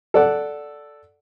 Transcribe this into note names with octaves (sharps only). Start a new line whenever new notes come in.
A4 D5 F#5